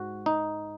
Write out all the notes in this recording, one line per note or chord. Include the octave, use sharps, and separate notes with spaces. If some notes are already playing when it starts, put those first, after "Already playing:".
Already playing: G#2 F#4
D#4